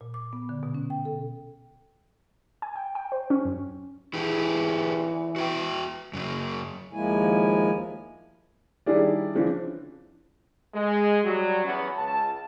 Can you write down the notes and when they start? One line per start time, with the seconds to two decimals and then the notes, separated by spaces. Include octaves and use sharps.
0.01 A#2
0.14 D6
0.33 B3
0.49 D3
0.63 B2
0.75 C#4
0.90 G5
1.05 A4
2.62 G#5
2.76 G5
2.95 G5
3.12 C5
3.30 C#4
3.45 F#2
4.14 E3 E4 G4 G#4
5.36 F#4 E5 G5
6.13 F#2 C#3 F#3
6.93 D#2 F3 G#3 A#3 E4 G#5
8.86 D#3 G3 D4 E4 G#4 D5
9.35 C#3 E3 F3 C4 D4
10.74 G#3
11.23 F#3 G3
11.64 E2 B3 C#4
11.95 C#2 A5